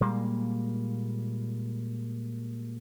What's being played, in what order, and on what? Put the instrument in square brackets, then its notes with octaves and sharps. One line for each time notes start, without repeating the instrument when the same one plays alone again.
[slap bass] A#2 G3 G#3 A#3